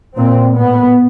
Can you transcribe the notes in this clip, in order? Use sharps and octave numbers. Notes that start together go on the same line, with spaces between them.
A#2 C4
A2 B3